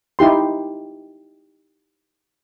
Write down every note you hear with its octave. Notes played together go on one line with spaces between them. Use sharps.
D#4 E4 G4 C6